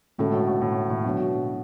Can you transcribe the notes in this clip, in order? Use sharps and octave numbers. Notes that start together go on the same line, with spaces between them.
A2 D3 G#3 C#4 F#4 A4
B2
B2
A2
A2
B2 F#3 B3 D4 F#4 C#5
B2